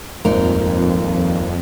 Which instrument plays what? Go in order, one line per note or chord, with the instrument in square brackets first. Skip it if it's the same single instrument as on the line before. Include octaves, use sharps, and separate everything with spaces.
[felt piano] D#1 G#1 [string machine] F2 [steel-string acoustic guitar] D#4 A#4